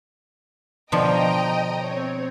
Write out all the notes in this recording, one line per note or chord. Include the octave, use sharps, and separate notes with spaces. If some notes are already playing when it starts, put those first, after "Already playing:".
B2 D3 F3 D#5 G5 A#5
C4 C#5